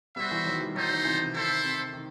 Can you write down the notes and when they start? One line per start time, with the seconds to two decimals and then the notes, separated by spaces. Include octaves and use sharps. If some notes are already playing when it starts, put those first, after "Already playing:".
0.16 G3 B3 F#4 C5 E5
0.31 E3 G3
0.45 D#3 F#3
0.60 E3 G3
0.75 D#3 F#3 A3 D#4 A4 C5
0.90 D#3 F#3
1.05 C3 E3
1.19 C3
1.34 D#3 E4 A4 C5 E5
1.64 C3
1.93 D#3